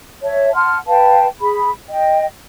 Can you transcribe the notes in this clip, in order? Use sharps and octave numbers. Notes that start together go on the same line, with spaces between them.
C#5 E5 A5
F#5 A5 C6 F6
B4 F5 G5 A5
G#4 B5
D#5 G5